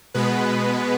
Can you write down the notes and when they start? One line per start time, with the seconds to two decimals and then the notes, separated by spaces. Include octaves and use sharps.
0.14 B2 G#3 B3 B4